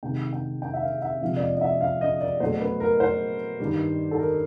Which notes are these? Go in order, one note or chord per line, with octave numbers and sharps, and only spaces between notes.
C3 D#3 G#3 G5
G5
G5
E5
F5
E5
C3 F3 G#3 F5
D5
D#5
D#5
E5
F5
D#5
D5
B2 F#3 A3 C5
B4
A#4
C5
G2 D#3 G3
A4
A#4